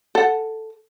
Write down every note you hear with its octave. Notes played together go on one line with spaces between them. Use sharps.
A4 F#5